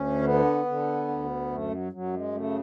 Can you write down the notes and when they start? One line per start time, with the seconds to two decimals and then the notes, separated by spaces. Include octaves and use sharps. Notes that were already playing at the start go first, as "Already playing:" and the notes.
Already playing: D2 C#4
0.22 D3 B3
0.66 D3
1.08 D2
1.50 F#2 A3
1.71 F#3
1.92 F#2 F#3
2.14 G#3
2.35 C#3 A3